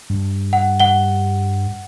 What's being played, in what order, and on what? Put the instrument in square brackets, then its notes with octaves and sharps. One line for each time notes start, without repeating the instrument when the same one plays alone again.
[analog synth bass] G2
[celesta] F#5
F#5 G7